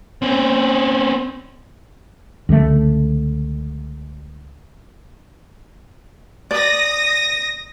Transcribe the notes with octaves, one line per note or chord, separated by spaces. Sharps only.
C4 C#4
C#2 D3 D#3 A3
D5 D#6 A#6